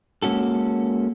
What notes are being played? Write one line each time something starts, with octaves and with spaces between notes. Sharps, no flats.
G#3 A#3 C#4 F#4 A4